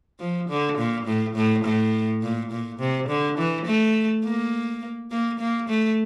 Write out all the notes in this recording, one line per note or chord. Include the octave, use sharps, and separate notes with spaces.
F3
D3
A#2
A2
A2
A2
A#2
A#2
C3
D3
E3
A3
A#3
A#3
A#3
A3